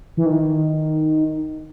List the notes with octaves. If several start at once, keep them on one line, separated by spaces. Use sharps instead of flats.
E3
D#3